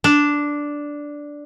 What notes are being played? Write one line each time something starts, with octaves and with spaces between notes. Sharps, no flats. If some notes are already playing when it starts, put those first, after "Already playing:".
D4